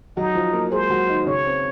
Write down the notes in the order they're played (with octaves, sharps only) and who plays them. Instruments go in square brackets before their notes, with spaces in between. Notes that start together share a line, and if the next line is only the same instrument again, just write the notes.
[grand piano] F#3 F#4 [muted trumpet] D#4
[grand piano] F3 F4
A#3 A#4
[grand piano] G#3 G#4 [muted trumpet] C5
[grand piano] F#3 F#4
D#3 D#4
[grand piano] C#3 C#4 [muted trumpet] C#5
[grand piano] C4